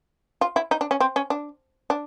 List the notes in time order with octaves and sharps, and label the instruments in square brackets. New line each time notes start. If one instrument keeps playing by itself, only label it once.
[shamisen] F4
E4
D#4
D4
C#4
C4
C#4
D4
D4